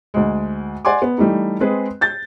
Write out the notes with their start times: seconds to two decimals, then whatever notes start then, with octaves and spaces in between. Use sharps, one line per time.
0.14 D2 G#3
0.85 D5 F#5 G#5 C6 D6
1.02 B3
1.18 E3 G3 A3 D#4
1.60 G#3 C4 G#4 B4
2.01 G6 A6